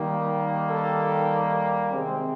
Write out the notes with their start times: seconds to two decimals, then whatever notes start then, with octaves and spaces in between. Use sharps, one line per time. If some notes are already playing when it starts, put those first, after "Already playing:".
Already playing: D#3 G3 A#3
0.67 A4
1.92 C3 D#3 G#3 C4